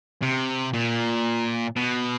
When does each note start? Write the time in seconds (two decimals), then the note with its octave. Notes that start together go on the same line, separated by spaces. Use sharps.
0.22 C3
0.73 A#2
1.76 B2